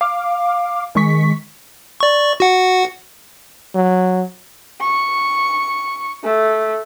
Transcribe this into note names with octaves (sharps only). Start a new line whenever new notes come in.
F5 D6
D#3 G#3 C#6 B6
D5 C#6
F#4 F#5
F#3
C#6
A3